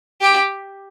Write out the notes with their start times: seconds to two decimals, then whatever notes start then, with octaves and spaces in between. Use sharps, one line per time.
0.21 G4